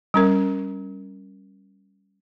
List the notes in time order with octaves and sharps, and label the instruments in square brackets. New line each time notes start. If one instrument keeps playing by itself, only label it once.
[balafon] G3 C#4 A#4